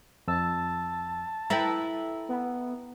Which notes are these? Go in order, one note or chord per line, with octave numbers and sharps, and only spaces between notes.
F2 A5 E6
E4 A4 B4 G5 A#5
B3